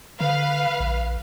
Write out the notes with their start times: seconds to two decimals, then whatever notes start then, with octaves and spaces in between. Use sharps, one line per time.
0.21 D3 B4 F5
0.80 A#1